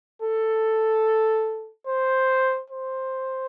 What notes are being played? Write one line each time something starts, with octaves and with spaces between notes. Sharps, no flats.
A4
C5
C5